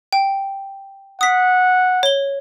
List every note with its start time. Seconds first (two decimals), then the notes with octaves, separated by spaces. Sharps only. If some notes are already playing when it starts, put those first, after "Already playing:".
0.13 G5
1.21 F#5 D#6 B6
2.03 C#5 G7